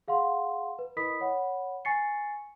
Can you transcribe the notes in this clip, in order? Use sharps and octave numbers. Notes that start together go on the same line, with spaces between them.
G#4 F5 F#5 C6
B4
E4 A#4 D#5 B5 D#6 B6
C#5 F#5 B5
G#5 C#6 A6 C7 C#7